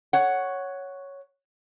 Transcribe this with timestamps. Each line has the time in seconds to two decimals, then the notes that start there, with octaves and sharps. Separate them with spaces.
0.13 C#5 F#5